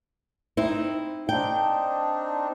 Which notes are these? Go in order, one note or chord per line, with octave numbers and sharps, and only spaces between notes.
C4 D#4 E4
C4 D4 D#4 G5